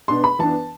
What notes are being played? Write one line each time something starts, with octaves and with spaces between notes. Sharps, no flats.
B2 B3 D4 C6
B5
E3 B3 D4 A5